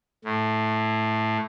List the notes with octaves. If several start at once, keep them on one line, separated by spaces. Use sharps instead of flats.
A2